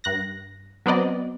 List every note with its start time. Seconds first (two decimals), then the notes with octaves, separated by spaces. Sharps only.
0.04 G2 F#6 A#6
0.86 F#3 B3 C4 D5 D#5